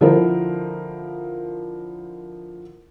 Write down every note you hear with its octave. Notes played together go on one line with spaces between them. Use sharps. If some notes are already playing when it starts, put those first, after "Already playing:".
D3 F3 E4 A#4 C5